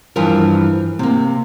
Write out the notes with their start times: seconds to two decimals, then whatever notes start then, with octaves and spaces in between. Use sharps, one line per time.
0.16 G2 E3 F3 F4 A#4
0.99 C3 A#3